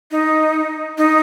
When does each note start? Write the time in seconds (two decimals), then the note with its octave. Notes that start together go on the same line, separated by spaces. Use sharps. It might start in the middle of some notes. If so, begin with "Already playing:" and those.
0.11 D#4
0.98 D#4